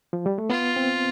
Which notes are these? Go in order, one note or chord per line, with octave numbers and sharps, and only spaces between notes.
F3
G3
A3
B3 F4
C4